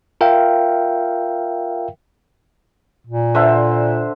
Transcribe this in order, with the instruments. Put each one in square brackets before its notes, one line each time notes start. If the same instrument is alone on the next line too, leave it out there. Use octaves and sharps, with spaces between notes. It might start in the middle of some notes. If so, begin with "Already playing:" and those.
[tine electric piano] F4 A#4 E5 F5 G5
[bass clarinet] A#2
[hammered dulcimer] D3 C5 E5